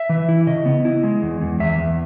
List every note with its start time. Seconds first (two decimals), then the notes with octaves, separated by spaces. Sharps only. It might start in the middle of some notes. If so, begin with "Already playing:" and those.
Already playing: E5
0.09 E3
0.29 E4
0.47 C#3 D#5
0.65 B3
0.85 E4
1.04 G#3
1.22 E2
1.41 E2
1.60 E2 E5
1.79 E2